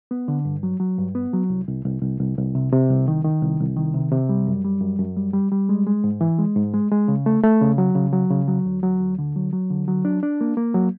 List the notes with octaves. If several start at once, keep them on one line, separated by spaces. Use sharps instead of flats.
B3
D3
G2
F#3
F#3
G2
B3
F#3
C2
C2
C2
C2
C2
C2
C3
C3
C2
D#3
D#3
C2
C2
D#3
C3
C3
G3
F#2
G3
F#2
F#2
G3
G3
G3
G#3
G#3
G#2
E3
G#3
G#2
G#3
G#3
C#3
A3
A3
C#3
F#3
C#3
F#3
C#3
F#3
D2
F#3
D2
D3
F#3
F#3
D3
F#3
D4
D4
A#3
A#3
F#3